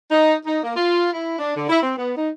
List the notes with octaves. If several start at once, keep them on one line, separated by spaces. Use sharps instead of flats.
D#4
D#4
A#3
F4
E4
D4
D3
E4
C4
B3
D#4